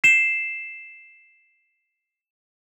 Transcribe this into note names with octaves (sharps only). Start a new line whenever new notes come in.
C7 E7